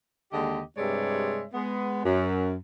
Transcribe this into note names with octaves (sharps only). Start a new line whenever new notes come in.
D#2 D3 G#3 G4 D#5
G2 C3 G#3 C#5 D5 E5
G#3 B3
F#2